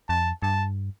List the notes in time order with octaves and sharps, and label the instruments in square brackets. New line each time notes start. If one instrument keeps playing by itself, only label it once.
[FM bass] F2 [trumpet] A5
[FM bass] G2 [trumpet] A5